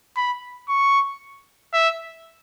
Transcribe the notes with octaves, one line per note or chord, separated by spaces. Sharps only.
B5
C#6
E5